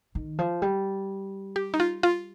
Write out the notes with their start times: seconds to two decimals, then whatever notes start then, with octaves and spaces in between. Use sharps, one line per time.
0.15 D#3
0.39 F3
0.62 G3
1.56 G4
1.74 D#4
1.80 F4
2.03 F4